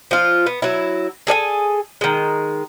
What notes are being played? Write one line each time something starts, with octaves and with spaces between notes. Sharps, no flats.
F3 F4
B3
F#3 E4
G#4 A4 D5 G#5
D#3 G#3